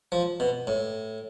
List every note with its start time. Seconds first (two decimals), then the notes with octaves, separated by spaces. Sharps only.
0.12 F3
0.40 B2
0.67 A2